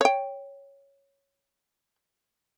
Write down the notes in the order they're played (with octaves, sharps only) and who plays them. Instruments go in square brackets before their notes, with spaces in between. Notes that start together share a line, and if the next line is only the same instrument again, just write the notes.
[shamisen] C#5 G5